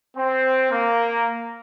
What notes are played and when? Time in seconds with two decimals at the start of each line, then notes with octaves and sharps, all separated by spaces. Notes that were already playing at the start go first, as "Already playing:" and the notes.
0.17 C4
0.72 A#3